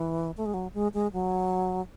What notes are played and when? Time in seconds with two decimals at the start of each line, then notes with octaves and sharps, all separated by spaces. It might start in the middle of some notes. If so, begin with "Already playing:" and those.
Already playing: E3
0.37 A3
0.46 G#3
0.54 F#3
0.74 G#3
0.94 G#3
1.13 F#3